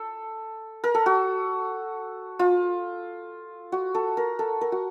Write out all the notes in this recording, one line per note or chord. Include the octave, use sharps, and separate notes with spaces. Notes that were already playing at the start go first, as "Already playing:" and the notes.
Already playing: A4
A#4
A4
F#4
F4
F#4
A4
A#4
A4
A#4
F#4